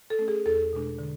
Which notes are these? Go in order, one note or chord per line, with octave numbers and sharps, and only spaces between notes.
A4
A3 C#4
G#4
E2 A4
B2 G#3 D4
D3